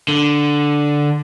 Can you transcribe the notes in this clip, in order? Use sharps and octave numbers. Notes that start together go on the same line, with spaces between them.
D3